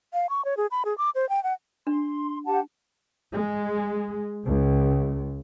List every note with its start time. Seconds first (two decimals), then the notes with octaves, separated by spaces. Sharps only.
0.14 F5
0.30 C#6
0.45 C#5
0.57 G#4
0.71 B5
0.85 G#4
0.98 D6
1.15 C5
1.29 G5
1.44 F#5
1.87 D4 C6
2.46 G4 F#5 A5
3.32 G#3
4.45 C#2